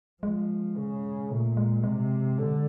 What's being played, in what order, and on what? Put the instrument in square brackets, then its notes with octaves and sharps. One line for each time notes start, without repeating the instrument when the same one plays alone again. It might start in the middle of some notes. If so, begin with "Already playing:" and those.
[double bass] F3 [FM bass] G#3
[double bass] C#3
[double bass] A#2 [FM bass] A3
[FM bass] G#3
[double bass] C3 [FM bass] G#3
[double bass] D3